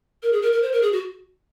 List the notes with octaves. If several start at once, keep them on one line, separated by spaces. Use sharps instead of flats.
A#4
G#4
A#4
A#4
C5
A#4
G#4
F#4